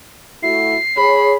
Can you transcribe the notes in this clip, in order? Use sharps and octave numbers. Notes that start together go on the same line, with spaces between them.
A3 E4 F#4 C7
G#4 C#5 B5